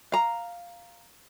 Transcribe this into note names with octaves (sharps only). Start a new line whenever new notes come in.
F5 A#5